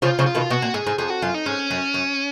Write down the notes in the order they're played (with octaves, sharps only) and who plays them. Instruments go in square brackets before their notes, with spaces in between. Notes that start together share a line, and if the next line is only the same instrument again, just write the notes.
[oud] C#3 F3 [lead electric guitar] F4
[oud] C#3 F3
[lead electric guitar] F4
[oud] B2 D#3
[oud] B2 [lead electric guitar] F#4
[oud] A#2
[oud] G#2 [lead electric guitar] G#4
[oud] G#2
[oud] F2 [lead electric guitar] G#4
[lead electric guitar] F#4
[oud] F#2 [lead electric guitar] F4
[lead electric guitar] D#4
[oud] G#2 [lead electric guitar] C#4
[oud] F#2
F#2